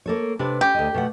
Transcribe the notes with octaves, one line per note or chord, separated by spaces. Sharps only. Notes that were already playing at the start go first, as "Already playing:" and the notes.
A#3 A4 C#5
C3 D4 B4
C#4 G4
D2 D#5
B2 A3 F#5